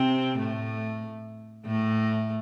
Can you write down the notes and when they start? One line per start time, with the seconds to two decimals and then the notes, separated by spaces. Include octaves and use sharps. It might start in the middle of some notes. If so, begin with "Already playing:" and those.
Already playing: C3 C4
0.38 A2 A3
1.66 A2 A3